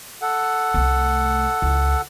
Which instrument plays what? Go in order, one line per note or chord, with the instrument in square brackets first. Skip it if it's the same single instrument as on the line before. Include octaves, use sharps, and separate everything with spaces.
[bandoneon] A4 F#5
[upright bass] C2 A3
C#2 E4